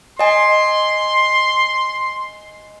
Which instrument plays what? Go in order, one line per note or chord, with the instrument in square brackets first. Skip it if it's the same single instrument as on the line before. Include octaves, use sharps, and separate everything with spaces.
[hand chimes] D#5 G#5 [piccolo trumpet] C6